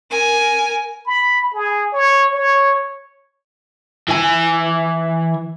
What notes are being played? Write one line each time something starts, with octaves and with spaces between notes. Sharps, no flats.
A#4 G#5
B5
G#4
C#5
C#5
E3 G#5